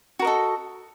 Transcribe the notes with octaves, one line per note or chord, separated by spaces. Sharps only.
F#4 A4 A#4 D#5